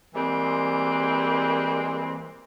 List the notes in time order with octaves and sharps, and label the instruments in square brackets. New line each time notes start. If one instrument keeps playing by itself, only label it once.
[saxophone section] E3 G3 G#3 A#3 C4